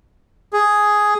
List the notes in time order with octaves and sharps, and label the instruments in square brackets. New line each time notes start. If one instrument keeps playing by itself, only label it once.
[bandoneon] G#4